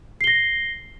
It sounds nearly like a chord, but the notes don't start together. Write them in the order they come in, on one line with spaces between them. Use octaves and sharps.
C7 G7 A#6